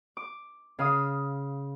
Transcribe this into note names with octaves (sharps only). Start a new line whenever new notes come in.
D6
C#3 F5 D#6